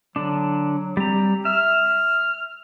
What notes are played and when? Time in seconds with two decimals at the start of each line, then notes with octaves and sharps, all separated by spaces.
0.16 D3 F#3 D4
0.97 G3 C4 A#5
1.45 E5 F6